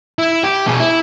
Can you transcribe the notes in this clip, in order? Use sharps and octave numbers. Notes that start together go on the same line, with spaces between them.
E4
G4
B2 G#4
E4